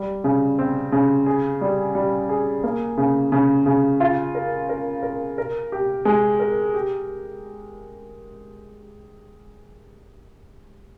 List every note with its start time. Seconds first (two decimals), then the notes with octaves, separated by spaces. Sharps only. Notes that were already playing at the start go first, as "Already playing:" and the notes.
Already playing: G3
0.24 C#3
0.59 C4
0.92 C#3
1.26 G#4
1.61 G3
1.95 G3
2.29 G#4
2.64 A#3
2.98 C#3
3.32 C#3
3.66 C#3
4.00 F4
4.35 A#4
4.69 A#4
5.03 A#4
5.38 A#4
5.72 G4
6.05 G#3
6.40 A#4
6.74 G4